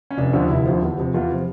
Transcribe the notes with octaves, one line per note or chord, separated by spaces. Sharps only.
C#4
F1 D4
D#2 D3 F3
F1 E4
D#2 D3 F3
E2
C3 F3
E2 F4
C3 F3